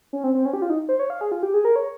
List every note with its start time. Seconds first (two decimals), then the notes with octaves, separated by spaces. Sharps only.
0.13 C#4
0.24 C4
0.35 C4
0.46 C#4
0.53 G4
0.62 F4
0.70 D#4
0.89 C5
0.99 C#5
1.10 F5
1.21 G#4
1.32 F4
1.43 G4
1.54 G#4
1.65 A#4
1.76 C#5